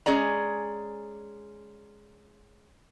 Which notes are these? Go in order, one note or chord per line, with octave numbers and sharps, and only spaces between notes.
G#3 C#4 G#4 D5 A#5